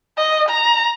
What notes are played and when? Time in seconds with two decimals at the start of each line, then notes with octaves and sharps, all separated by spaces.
0.18 D#5
0.49 A#5